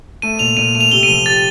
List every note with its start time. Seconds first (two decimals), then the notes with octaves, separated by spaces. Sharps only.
0.22 A3 D#7
0.39 A#2 F7
0.57 A#2 D#7
0.75 A3 D#7
0.81 F7
0.92 C3 G7
1.03 D#7
1.09 F3
1.26 G4 A6